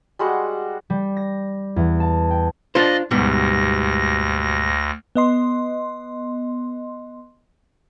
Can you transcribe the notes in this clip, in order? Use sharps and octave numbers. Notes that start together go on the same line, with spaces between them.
G3 G#3 F#4 F#5
G3
A#6
E2
A5
G5
D4 F4 C5 D5 D#5
D2 G#2 B2 G3 A#6
B3 D#5 C6